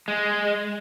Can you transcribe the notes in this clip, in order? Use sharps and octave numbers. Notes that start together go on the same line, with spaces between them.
G#3